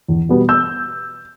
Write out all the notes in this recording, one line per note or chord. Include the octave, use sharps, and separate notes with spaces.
E2
B2 G3 B3
E6 G6